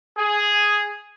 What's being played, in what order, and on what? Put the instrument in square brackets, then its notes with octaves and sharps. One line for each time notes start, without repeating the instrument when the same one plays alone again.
[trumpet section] G#4